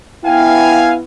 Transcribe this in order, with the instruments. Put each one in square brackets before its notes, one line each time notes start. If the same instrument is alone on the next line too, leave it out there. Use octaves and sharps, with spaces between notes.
[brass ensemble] B3 E4 [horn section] F5 G#5 [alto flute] G5